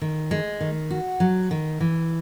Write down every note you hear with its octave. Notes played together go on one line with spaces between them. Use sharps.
D#3
G#3
D#3
F#4
F#3
D#3
E3